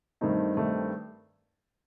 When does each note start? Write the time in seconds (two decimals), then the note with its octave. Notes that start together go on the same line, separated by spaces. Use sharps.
0.21 G2 D#3 A3 C4 D#4
0.56 G2 D#3 A3 C4 D#4